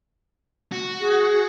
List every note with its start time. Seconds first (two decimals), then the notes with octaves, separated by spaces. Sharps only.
0.72 F#4
1.00 G#4